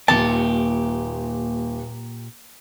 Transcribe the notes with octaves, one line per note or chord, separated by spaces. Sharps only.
D#1 A#2 G4 A5 E7